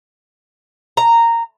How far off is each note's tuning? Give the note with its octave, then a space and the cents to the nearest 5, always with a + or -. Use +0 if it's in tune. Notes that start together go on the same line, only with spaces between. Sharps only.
A#5 -10